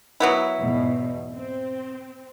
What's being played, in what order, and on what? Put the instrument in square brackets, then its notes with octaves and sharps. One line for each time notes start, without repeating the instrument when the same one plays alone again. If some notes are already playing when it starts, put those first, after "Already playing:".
[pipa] F#3 B3 E4
[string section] E2 G#2 B2
C4